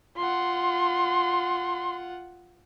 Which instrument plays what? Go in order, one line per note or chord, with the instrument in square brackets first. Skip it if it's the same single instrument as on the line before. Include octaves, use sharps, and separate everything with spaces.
[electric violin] F4 F#5 [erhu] C6